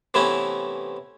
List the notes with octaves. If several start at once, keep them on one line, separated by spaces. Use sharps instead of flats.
C3 E3 A3 B3 C#4 E4